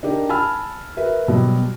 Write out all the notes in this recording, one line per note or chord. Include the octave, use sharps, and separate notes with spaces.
D4 D#4 G4 A#4
G#5 A5 B5 E6 F6
F#4 A#4 B4 E5
B2 F#3 G3